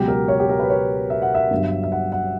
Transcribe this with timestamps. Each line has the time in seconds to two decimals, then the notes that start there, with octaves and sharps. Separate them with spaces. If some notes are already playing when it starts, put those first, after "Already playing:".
Already playing: C#2 B2 F#3 G4
0.08 A#4
0.28 C#5
0.40 G4
0.49 A#4
0.60 B4
0.70 C#5
1.10 E5
1.22 F#5
1.35 E5
1.51 G1 G2 F#3
1.84 E5
1.92 F#5
2.12 F#5